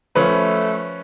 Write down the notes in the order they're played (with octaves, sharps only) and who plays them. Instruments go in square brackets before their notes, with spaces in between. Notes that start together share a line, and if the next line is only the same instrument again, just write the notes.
[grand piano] F3 C#4 B4 [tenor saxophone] A3